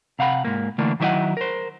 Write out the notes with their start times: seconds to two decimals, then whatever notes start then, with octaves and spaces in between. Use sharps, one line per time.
0.19 C3 F5 F#5 B5
0.45 G#2 A#3
0.78 D3 E3 A3 A#3 D4
1.00 D#3 F#3 E4 C#5 D#5 F#5
1.37 A#4 C5